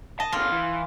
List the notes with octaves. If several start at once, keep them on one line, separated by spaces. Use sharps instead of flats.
D#5 A5
B2 D3 F4
E3